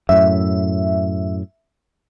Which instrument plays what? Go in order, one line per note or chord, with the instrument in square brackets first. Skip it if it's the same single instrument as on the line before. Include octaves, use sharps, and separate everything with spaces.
[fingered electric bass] F#2 A2 [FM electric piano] E5